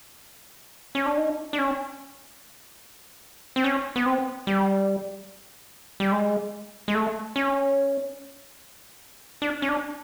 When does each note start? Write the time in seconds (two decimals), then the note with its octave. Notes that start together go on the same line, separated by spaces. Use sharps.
0.95 C#4
1.06 D4
1.17 D#4
1.53 D4
1.59 C#4
3.56 C4
3.64 C#4
3.96 B3
4.06 C4
4.47 G3
6.00 G3
6.12 G#3
6.88 G#3
6.95 A3
7.36 C#4
9.42 D4
9.62 C#4
9.69 D4